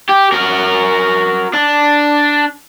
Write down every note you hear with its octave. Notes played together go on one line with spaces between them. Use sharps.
G4
F#4 A#4
D4